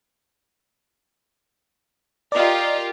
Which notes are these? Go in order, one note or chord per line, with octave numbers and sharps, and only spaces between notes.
F4 G4 A#4 D5 D#5